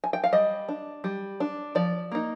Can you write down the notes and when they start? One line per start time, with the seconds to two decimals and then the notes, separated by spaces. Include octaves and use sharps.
0.04 G#5
0.13 G5
0.24 F5
0.33 G3 D#5
0.69 D4
1.04 G3
1.40 D4
1.75 F3 D5
2.12 A#3 D#4